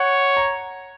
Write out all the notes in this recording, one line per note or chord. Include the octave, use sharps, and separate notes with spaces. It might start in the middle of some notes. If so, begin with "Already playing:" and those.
Already playing: C#5 F#5
A#5